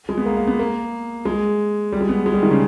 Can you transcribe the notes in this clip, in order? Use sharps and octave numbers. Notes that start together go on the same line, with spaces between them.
G#3
B3
A#3
A#3
B3
A#3
G#3
G3
G#3
B3
G#3
G3
D#3
C#3